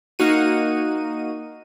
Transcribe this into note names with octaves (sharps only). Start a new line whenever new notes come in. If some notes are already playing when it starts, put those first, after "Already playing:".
A#3 D#4 F#4 D#7